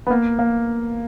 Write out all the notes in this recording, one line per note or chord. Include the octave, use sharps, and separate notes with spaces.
B3
A#3
A#3